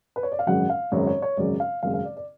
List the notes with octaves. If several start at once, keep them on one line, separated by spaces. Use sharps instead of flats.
B4
C#5
D5
F5
G#1 F#2 C#3 F#3 F#5
F5
G#1 F#2 C#3 F#3 C#5
C#5
C#5
G#1 F#2 C#3 F#3 D5
F5
G#1 F#2 C#3 F#3 F5
F5
D5
D5